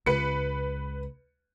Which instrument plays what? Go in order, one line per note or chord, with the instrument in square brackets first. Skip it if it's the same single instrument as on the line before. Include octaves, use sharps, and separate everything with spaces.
[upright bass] C#2 [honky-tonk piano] B4 C#7